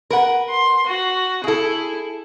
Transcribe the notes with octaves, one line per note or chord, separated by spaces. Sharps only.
A#4 B4 F#5
C6
F#4
E4 G#4 A4